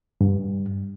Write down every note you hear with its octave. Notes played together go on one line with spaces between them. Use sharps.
G2